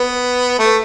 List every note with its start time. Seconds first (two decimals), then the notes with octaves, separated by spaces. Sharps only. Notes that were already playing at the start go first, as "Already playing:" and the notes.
Already playing: B3
0.59 A3